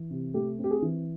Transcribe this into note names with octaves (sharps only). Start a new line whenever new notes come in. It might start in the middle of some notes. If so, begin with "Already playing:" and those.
Already playing: E3
C3
A3 G4
C4 G4
G#4
E3